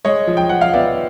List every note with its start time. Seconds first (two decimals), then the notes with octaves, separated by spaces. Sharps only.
0.05 G#3 C#5 D#5
0.27 F3
0.37 G5
0.49 F3 F#5
0.61 F5
0.74 B3 D5 E5